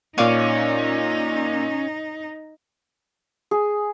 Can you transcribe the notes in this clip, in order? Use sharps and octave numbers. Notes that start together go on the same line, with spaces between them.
A#2 C#4 D#4 C#5 D5 F5 D6 D#7
G#4